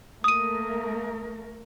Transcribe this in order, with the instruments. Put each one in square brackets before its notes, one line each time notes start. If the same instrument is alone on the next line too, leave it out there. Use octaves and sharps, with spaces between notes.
[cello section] A3 A#3 A#4 [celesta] D#6 D#7